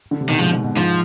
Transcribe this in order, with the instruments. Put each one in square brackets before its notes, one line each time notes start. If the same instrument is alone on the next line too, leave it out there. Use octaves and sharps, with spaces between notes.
[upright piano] D3
C3
[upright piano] B2 [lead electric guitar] D#3
[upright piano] G#2 [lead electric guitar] F3
[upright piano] G#2
B2
[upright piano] G#2 [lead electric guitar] F3